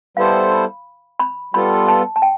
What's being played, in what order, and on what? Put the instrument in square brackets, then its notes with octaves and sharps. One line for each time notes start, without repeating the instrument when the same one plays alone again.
[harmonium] G3 B3 E4 A4 C5 [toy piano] F5
[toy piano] B5
B5
[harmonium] G3 B3 F4 A4 [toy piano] B5
[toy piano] A5
A5
G5